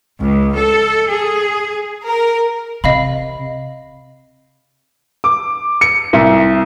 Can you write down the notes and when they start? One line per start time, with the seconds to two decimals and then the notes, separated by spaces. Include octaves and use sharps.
0.22 C#2
0.57 A4
1.10 G#4
2.07 A#4
2.84 C3 D#5 F5 B5
5.24 D6
5.81 C#7
6.13 C2